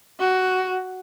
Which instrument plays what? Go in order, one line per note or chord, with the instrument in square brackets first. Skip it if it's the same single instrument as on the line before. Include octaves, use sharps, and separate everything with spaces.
[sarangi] F#4